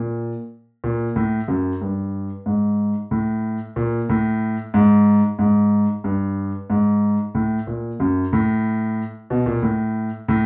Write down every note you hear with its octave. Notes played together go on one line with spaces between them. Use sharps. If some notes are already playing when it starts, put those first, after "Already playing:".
Already playing: A#2
A#2
A2
F#2
G2
G#2
A2
A#2
A2
G#2
G#2
G2
G#2
A2
A#2
F#2
A2
B2
A#2
A2
A2